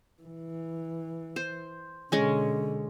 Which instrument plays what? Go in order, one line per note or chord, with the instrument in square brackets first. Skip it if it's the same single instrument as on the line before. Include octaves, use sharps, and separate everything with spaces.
[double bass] E3
[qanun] C5
[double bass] B2 D3 [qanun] G#3 C#4